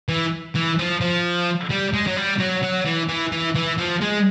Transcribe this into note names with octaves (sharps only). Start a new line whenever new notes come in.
E3
E3
F3
F3
G3
G#3
F#3
G3
F#3
F#3
E3
E3
E3
E3
F3
G#3